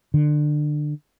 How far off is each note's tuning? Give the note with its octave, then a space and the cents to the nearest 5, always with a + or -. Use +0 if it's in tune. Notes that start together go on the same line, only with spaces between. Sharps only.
D3 +25